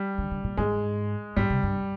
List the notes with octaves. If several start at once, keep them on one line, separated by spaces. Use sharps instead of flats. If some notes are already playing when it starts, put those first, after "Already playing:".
Already playing: G3
D3
D3
A#2
G#2 G#3
G#2 G3
C3
G2